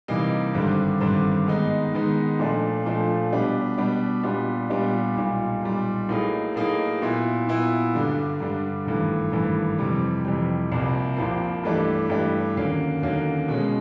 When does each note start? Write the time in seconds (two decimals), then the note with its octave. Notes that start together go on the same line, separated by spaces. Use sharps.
0.08 C3 E3 G3 A#3 D#4
0.54 G#1 G2 D3 G3 C4
1.01 G#1 G2 D3 G3 C4
1.47 G#2 D#3 G#3 B3 D#4
1.92 G#2 D#3 G#3 B3 D#4
2.39 A#2 F3 A3 D4
2.85 A#2 F3 A3 D4
3.32 B2 G3 B3 D4 G4
3.78 B2 G3 B3 D4 G4
4.23 A#2 G3 B3 D4 G4
4.70 A#2 G3 B3 D4 G4
5.16 B1 A#2 G3
5.63 B1 A#2 G3
6.09 A2 F#3 A#3 D#4 G#4
6.56 A2 F#3 A#3 D#4 G#4
7.01 A#2 F#3 B3 E4
7.47 A#2 F#3 B3 E4
7.93 G2 D3 G3
8.40 G2 D3 G3
8.86 G#1 G2 E3 A3
9.32 G#1 G2 E3 A3
9.78 F2 C3 E3 G3
10.25 F2 C3 E3 G3
10.72 C2 C3 F3 A#3
11.17 C2 C3 F3 A#3
11.63 G2 E3 A3 D4 G4
12.09 G2 E3 A3 D4 G4
12.56 D#2 D3 F#3 A#3 C#4
13.02 D#2 D3 F#3 A#3 C#4
13.48 B2 G#3 C#4